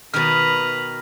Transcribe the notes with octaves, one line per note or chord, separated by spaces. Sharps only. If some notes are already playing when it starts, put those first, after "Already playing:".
B2 D#3 B4 A#5 F6